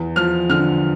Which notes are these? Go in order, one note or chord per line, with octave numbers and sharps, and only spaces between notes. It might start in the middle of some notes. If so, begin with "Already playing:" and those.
Already playing: E2
F3 F6
D3 F6